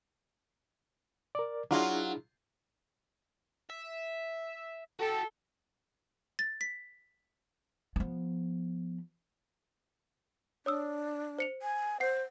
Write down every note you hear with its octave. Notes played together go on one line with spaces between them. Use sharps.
A#4 D5
F#3 D4 E4 F4 G#4
E5
F#4 A4 G5
A6
B6
F3 B3
D4 C#5 D#6 E6
C5 C#7 F7
G#5
C5 F#5 C7